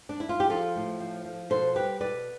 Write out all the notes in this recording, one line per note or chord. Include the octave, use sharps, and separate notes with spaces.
D4
E4
F4
G4
F3 F4 A4
A2
F3
F3
B2 A4 C5
G3 G4 B4
B2 B4 D5